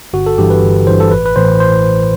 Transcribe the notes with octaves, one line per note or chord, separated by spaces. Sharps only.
G1 F#4
A4
G2 E3 G4
B4
G1
G2 E3 C5
A4
A1 B4
B4
A2 E3 C5
C5